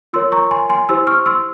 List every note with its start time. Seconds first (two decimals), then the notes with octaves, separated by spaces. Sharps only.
0.13 F4 A#4 C#5 C6 E6
0.32 A#5 C#6
0.51 G#5 C6
0.69 G#5 C6
0.89 E4 G4 C5 C6 E6
1.07 C#6 F6
1.26 C6 E6